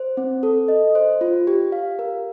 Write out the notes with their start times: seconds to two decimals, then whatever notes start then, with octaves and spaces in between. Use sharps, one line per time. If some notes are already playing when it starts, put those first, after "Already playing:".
Already playing: C5
0.17 C4
0.43 A4
0.68 D#5
0.95 C5
1.21 F4
1.47 G4
1.72 F5
1.99 A#4